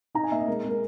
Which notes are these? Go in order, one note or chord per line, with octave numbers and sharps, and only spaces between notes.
D#4 A#5
G#5
A#3 E5
D#5
G#3 A#4
G#3 A#4